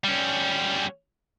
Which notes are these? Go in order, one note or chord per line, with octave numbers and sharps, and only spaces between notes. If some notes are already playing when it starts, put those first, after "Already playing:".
G3 C#4